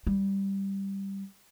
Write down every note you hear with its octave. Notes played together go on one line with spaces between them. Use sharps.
G3